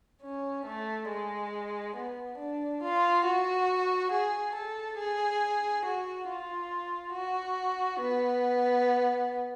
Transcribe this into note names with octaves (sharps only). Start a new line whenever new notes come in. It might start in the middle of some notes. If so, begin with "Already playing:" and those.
C#4
A3
G#3
B3
D4
F4
F#4
G#4
A4
G#4
F#4
F4
F#4
B3